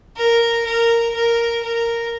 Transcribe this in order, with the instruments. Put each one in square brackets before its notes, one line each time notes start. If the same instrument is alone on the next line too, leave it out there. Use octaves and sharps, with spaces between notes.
[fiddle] A#4
A#4
A#4
A#4